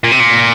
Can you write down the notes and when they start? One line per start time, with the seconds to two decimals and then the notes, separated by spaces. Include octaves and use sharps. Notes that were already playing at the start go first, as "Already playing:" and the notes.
0.04 A#2
0.12 C3
0.20 A#2